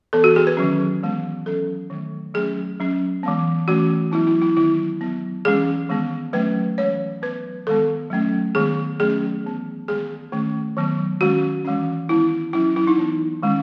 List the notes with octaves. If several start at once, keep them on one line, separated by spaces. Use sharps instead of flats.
E3 B3 A4
F#4
G#4
B4
D#3 F#3 C#4
E3 G#3 B3
F#3 C#4 A4
D#3 F#3 A3
F#3 A3 C#4 G#4
F#3 C#4
E3 G#3 B3
E3 A3 C#4 F#4
F#3 B3 E4
E4
E4
D#3 F#3 B3 E4
F#3 B3
E3 G#3 C#4 G#4
D#3 G#3 B3
F#3 A3 C#4 B4
E3 G#3 C#4 C#5
F#3 B3 B4
D#3 G#3 B3 A4
F#3 A3 C#4
D#3 G#3 B3 G#4
F#3 A3 C#4 G#4
E3 B3
D#3 G#3 B3 G#4
D#3 A3 C#4
D#3 F#3 B3
D#3 G#3 C#4 F#4
E3 G#3 C#4
D#3 G#3 B3 E4
F#3 C#4 E4
E4
D#4
E3 B3
D#3 G#3 C#4